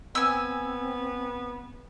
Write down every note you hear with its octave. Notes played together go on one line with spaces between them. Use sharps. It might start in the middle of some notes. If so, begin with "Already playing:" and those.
B3 C4 G#5 E6